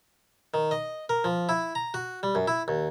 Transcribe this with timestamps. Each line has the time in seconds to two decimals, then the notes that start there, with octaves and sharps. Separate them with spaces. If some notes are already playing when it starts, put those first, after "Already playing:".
0.54 D#3
0.71 D#5
1.09 A#4
1.24 F3
1.49 E4
1.75 A#5
1.94 F#4
2.23 G3
2.35 F#2
2.48 E4
2.68 D#2